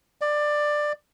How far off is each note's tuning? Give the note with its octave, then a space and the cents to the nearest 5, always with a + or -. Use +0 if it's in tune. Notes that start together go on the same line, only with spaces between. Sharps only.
D5 +15